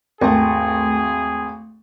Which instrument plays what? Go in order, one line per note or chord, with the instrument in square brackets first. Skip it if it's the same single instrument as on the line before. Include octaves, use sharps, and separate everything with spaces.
[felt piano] G#1 [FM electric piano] D#2 A3 [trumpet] G#4 [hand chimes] G5 A5